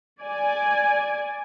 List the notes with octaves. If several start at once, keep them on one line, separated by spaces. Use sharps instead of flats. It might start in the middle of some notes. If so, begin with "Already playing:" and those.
D5 G#5